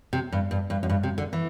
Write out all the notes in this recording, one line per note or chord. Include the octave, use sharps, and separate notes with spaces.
C3
G2
G2
G2
F#2
G2
C3
D3
E3